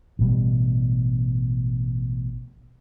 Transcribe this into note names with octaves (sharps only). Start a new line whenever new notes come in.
A1 B2 G3